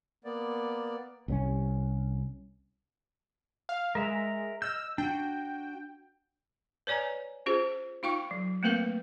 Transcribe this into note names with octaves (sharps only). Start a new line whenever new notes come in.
A#3 B3 D5
C2 C4 C#4
F5
G#3 A#4 E5 A#5
D#5 E6 F6 G6
D4 F#4 G5
B4 C#5 D5 G#5 A#5
C#4 F4 G#4 C5
D#4 F4 F5 G5 C#6
F#3
A3 A#3 C4 A#4 B4 F5